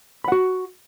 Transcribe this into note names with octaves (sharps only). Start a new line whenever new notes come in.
F#4 F#5 B5